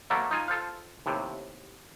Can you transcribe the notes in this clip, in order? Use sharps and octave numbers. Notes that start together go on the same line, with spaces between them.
B2 F#3 A3 A#3 A4 A#4
D#4 F4 G#5
F4 A4 C5 F5
D#2 A2 C3